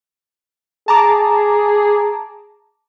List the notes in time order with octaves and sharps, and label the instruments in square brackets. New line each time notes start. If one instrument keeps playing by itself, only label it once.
[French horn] G#4 [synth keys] A5 A#5 D6